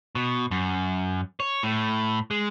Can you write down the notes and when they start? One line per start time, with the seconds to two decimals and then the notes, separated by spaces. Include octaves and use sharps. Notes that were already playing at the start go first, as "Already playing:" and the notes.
0.15 B2
0.51 F#2
1.40 C#5
1.63 A2
2.31 G#3